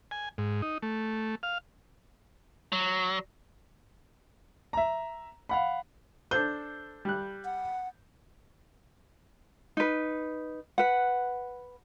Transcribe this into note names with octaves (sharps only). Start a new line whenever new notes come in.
G#5
G#2
D#4
A3
F5
F#3
E5 A#5
F5 F#5 B5
D4 A4 C5 G6
G3 F#6
F#5
D#4 B4
B4 F#5